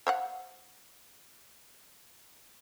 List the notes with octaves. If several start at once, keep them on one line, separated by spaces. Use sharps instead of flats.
C5 F5 F#5